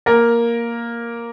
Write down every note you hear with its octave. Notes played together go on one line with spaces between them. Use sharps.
A#3 A#4